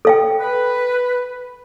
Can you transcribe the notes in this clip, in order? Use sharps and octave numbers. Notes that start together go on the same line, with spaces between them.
A4 F5 G5
B4